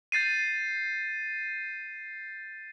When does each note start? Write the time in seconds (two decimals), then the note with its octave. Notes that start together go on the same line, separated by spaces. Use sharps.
0.12 G6 A6 C7 D#7